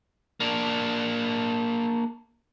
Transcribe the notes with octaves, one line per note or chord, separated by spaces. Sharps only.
A#3 D4